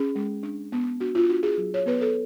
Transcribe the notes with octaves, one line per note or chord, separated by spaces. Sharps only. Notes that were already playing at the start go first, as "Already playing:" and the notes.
Already playing: C#4 G#4
G#3
D4
B3
D4 F#4
F4
D4 F#4
G#4
F#3
C#5
B3 B4
A4